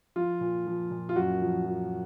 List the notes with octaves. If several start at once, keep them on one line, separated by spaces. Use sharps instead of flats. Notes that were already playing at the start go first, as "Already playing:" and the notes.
F3 F4
A#2
F3
A#2
F4
F#2 F#4
F3
F3